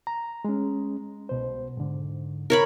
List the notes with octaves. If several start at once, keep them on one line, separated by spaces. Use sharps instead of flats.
A#5
G#3 C#4
C2 B2 C5
G#2 D3
A#4 C#5 B5